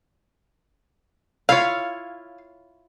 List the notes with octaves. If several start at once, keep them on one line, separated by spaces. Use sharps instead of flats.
E4 F4 C#5 F5